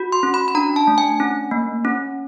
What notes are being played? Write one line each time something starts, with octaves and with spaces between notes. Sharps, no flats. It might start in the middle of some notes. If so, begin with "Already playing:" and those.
Already playing: F#4
C6
C#4
B5
B5
D4 A#5
A5
A3
G#5
C#4
A#3
C#4